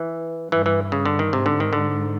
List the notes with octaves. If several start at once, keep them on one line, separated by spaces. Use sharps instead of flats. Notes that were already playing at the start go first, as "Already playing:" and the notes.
Already playing: E3
G2 E3
E3
C#3
D3
D#3
G#2 C3
D3
D#3
D3